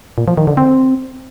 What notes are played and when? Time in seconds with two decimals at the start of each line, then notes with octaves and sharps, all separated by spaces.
0.18 A#2
0.28 F3
0.37 D#3
0.47 D3
0.57 C4